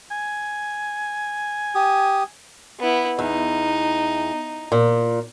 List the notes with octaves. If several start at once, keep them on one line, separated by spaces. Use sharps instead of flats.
G#5
G4 D#6
B3 E4
E2 D#4
A#2